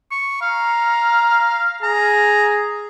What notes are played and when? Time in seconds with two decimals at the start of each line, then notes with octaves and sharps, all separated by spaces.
0.11 C#6
0.41 F5 A#5
1.83 G#4 A#5